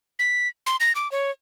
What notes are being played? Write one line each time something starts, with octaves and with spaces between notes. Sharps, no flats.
B6
C6
A#6
D6
C#5